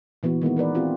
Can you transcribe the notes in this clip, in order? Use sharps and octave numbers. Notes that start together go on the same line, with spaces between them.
A#2 E3 B3 F#4
D#3 G#3 A#3 B3
E3 A#4 B4 D5
C4 E4 F4 G4